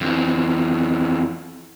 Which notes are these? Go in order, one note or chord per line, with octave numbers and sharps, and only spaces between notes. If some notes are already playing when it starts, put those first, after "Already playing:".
F2 E3